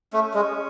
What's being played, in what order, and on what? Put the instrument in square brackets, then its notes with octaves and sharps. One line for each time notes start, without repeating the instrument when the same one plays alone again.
[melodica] A3 [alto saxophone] C#4
[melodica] G#3